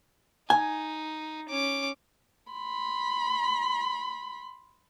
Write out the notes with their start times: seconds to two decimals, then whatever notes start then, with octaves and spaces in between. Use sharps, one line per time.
0.50 D#4 G#5
1.49 C#4 D6
2.52 B5 C6